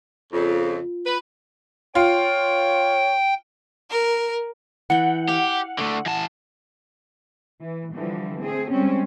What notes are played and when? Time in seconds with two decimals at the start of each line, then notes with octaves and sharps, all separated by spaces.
0.33 F2 C#3 F4
1.05 B4
1.95 F4 C#5 G5
3.90 A#4
4.90 E3 F#5 G5
5.29 G4 F5
5.79 D3 A3
6.06 E3 A5
7.60 E3
7.94 D3 E3 F3 G3
8.41 A3 C4 G#4
8.71 G3 G#3 C4 C#4